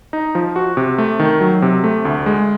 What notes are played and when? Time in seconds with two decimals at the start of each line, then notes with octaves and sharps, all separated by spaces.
0.13 D#4
0.35 F3
0.56 F#4
0.77 C3
0.98 A3
1.20 D#3
1.41 F#3
1.62 C3
1.84 A3
2.05 D2
2.26 G#3